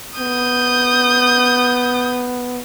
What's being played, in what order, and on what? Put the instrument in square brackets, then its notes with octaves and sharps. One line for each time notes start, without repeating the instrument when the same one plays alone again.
[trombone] B3 [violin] D#6 G6